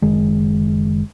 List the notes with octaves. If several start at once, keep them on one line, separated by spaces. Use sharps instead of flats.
F#1 D#3 G#3